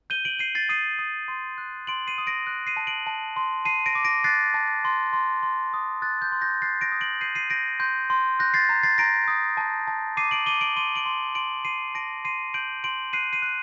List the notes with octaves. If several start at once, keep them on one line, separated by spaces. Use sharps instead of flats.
G6 D#7 G7
D7 F#7
G6 C7 D#7
A6 C7
D#6 C7 D#7
D#6
C6
F#6
C6 D7 F#7
C7 D#7
D#6
A#6 D7
F#6
C7 D#7
A5
D7 F#7
A5
C6
A5 C7 D#7
A#6 D7
D6
A#6 D7
F#6 A6 C7
A5
C6
C6
C6
D#6
F#6 A6
G6
C6
G6 A#6
F#6 A6 C7
A#6 D7
D#6
D7 F#7
G6 C7 D#7
C7 D#7
G6 A#6 D7
C6 G6
C6
F#6 G6 A#6
A6 C7
A#5
A6 C7
A#5 A#6 D7
D#6
A5
A5
D6 C7 D#7
D7 F#7
D6 D#7 G7
D7 F#7
C6 D#7 G7
D7 F#7
C6
C6 D7 F#7
C6 C7 D#7
A5 A#6 D7
C6 C7 D#7
G6 D7 F#7
C6 D7 F#7
F#6 C7 D#7
C7 D#7
F#6